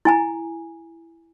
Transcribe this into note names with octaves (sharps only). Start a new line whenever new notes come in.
E4 G#5 A#5